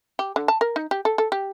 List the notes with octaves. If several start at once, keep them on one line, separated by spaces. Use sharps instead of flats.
G4
D3
A5
A#4
D#4
G4
A4
A4
G4